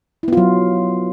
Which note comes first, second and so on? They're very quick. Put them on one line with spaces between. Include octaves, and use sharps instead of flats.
E4 B3 F4 F#3